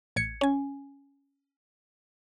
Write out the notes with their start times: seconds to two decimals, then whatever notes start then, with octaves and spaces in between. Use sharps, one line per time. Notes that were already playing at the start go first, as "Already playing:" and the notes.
0.16 A1 G#6 C#7
0.41 C#4 G#5